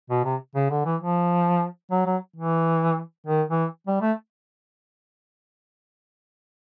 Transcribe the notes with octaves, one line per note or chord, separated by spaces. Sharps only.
B2
C3
C#3
D3
E3
F3
F#3
F#3
E3
D#3
E3
G3
A3